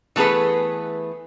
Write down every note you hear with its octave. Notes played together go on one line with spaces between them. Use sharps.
E3 A3 B3 G#4 B4